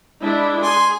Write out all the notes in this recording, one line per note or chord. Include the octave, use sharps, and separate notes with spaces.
G#3 D4 E4
G#4 G#5 C6